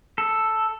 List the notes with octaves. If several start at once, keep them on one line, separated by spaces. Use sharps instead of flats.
A4